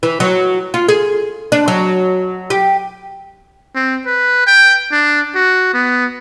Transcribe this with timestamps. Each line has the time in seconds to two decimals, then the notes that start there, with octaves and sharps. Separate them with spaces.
0.03 E3
0.20 F#3
0.74 F4
0.89 G#4
1.52 D4
1.68 F#3
2.50 G4
3.75 C4
4.06 B4
4.47 G5
4.92 D4
5.35 F#4
5.74 B3